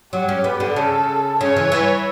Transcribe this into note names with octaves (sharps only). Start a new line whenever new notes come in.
F#3 G4
C#4
B3
D3
C#3 A4
C#3 C#5
E3
E3